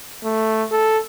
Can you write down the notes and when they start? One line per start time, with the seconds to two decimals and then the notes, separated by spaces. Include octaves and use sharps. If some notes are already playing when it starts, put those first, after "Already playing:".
0.24 A3
0.71 A4